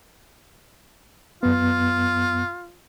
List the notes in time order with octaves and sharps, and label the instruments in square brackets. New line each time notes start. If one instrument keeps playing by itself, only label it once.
[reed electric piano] F#2 B3 [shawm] F4